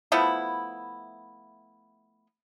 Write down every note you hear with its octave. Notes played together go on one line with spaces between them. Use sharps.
F3 A3 B3 E4